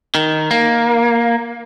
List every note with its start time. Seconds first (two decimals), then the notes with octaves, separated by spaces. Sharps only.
0.15 D#3
0.51 A#3